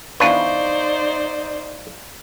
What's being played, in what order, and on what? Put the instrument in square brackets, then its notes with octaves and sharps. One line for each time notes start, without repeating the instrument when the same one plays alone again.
[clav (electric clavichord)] E2 D4 B4 [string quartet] D#4 C5 D5 [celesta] F5 C#6